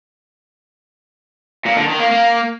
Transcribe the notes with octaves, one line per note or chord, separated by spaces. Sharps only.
A#2
D3
D#3
A#3
A#3